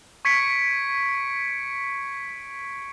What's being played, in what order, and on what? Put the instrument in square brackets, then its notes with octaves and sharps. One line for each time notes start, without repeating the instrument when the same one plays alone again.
[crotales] C#6 G#6 B6 C#7 D7